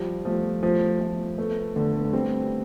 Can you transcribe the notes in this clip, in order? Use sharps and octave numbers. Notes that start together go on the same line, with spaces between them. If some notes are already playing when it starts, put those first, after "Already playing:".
Already playing: F3 G3
F3 A3
F3 A3
F3 A3
A3 B3
D3 A3
B3
A3
G3 C4